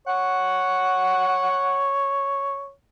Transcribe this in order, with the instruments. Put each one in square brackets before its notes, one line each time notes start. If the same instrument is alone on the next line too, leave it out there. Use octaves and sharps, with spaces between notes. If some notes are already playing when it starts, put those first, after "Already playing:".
[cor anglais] C#5 [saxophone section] F#5